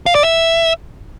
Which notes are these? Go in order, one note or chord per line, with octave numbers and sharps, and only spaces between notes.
F5
D5
E5